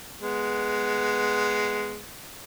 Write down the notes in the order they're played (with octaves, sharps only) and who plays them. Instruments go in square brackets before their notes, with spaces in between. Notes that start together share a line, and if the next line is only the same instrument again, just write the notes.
[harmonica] G#3 B3